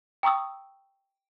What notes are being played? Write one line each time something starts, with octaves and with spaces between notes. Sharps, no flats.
G5 A#5 C#6 D#6 E6